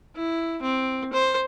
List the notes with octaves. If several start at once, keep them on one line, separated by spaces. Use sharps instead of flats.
E4
C4
C5